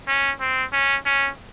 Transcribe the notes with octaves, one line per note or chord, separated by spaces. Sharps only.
C#4
C4
C#4
C#4